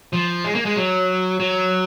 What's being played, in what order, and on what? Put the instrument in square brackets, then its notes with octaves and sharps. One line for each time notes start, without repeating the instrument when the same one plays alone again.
[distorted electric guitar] F3
G#3
A#3
G#3
F#3
F#3